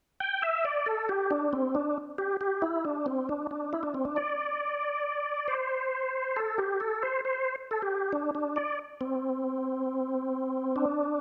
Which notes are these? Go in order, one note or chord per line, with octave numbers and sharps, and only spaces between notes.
G5
E5
D5
A4
G4
D4
C4
D4
G4
G4
E4
D4
C4
D4
D4
E4
D4
C4
D4
D5
C5
A4
G4
A4
C5
C5
A4
G4
D4
D4
D5
C4
D4